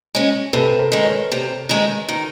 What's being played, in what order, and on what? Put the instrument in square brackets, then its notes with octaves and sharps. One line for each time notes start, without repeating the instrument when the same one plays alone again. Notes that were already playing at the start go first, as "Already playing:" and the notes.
[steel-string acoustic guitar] G#3 C#4
[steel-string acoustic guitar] C3 [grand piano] A4 B4
[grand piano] A#4 C5
[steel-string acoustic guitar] D#3 G#3
[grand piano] B4 C#5
[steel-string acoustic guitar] C3
D#3 G#3
D#3